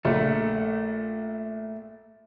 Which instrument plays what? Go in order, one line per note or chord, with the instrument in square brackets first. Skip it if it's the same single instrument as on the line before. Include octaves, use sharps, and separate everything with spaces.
[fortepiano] A#1 [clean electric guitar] A3